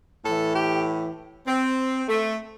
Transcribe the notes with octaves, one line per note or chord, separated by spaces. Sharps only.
A2 E3 A4
G4
C4
A3